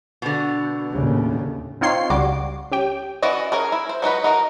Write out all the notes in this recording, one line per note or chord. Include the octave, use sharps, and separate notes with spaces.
B2 D3
D#2 A2 C#3
C4 D#4 F4 C#5 C6 C7
C#2 G3 F#4 D6
C#4 G4 G5
E3 C#4 F#4 D5 D#5
C#4 G#4 A#4
E4
C5
F#3 D#4 F#4 B4
D#4 F#4 A#4